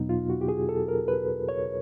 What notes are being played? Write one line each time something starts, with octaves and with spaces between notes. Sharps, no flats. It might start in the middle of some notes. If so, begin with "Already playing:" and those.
Already playing: E2 B2 F#3 B3 D#4
F4
F#4
G4
G#4
A4
A#4
B4
C#5